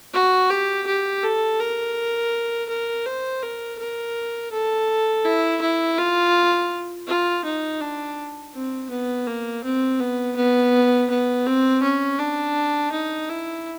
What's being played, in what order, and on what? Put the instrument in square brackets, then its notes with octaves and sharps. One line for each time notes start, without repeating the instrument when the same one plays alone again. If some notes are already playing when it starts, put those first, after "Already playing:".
[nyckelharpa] F#4
G4
G4
A4
A#4
A#4
C5
A#4
A#4
A4
E4
E4
F4
F4
D#4
D4
C4
B3
A#3
C4
B3
B3
B3
C4
C#4
D4
D#4
E4